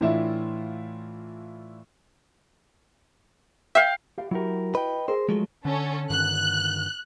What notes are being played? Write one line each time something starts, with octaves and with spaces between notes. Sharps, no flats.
A2 E3 D4 E4 F4 E5
E5 F5 G5
G4 F5
F#3 E4 F#4 G4 A#4
B4 D#5 G5
G#4 A#4 C5
F3 F#3 G#3 A3
D3 C#4 A4
G2 D3 D#3 F#6